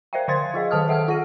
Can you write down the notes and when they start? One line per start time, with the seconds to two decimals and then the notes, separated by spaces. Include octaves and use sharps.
0.13 A#4 C5 D5 E5 F5 G5
0.28 D3 C5 F5 C6 G#6 A6
0.54 F4 G#4 D#5 F5
0.71 D#3 A4 A5 D#6 F6
0.88 A4 E5 F#5 E6 F6
1.08 F4 F#5 A#6 D#7